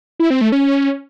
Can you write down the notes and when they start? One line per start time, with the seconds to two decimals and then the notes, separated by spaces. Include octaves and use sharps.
0.20 E4
0.30 C4
0.41 A3
0.52 C#4